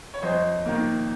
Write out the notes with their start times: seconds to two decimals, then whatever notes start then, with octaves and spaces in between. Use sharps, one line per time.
0.14 C#5
0.22 F2 C5 D#5
0.66 D#3 A#3